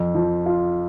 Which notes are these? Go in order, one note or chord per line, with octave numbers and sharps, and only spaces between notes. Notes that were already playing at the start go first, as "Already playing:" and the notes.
Already playing: F2
F3
F4